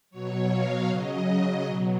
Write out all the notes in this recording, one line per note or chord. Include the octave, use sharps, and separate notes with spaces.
B2 F#3 C#5
F5
C#3 F#3 D#5
B2 F#3